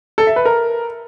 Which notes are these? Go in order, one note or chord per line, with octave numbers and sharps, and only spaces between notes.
A4
E5
B4
A#4